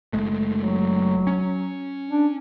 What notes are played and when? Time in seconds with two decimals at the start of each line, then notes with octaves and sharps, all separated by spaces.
0.13 F#1 G#3 A3
0.54 F#3
1.27 C#4
2.09 D4